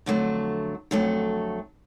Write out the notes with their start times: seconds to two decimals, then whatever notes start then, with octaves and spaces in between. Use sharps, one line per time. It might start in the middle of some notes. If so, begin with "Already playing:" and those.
0.06 F2 D3 F#3 A3
0.91 F2 D3 F#3 A3